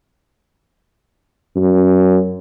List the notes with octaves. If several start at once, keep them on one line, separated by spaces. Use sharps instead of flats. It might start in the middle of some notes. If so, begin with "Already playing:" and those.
F#2